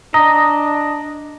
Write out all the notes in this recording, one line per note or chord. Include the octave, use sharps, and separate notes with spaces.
D4 D#5 A#5 D#6